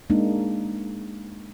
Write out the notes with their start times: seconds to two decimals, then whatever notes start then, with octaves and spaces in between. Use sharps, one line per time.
0.10 G#3 A#3 D4 D#4